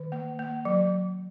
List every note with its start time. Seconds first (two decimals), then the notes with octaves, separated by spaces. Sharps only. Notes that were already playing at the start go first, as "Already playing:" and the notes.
Already playing: D#3
0.12 A#3
0.39 A#3
0.65 F#3